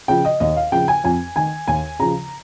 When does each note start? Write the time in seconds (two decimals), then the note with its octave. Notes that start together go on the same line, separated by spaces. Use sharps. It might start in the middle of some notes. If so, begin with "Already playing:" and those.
0.08 C#3 F3 G5
0.25 D#5
0.40 D#2 D#5
0.56 F5
0.72 C#3 F3 G5
0.88 G#5
1.04 F2 G#5
1.36 D#3 G#5
1.68 D#2 G#5
2.00 C#3 F3 A#5